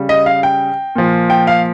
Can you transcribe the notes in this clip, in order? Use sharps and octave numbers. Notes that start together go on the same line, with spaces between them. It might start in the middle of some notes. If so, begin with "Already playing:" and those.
Already playing: C#3 G3
D#5
F5
G5
A#2 F3
G5
F5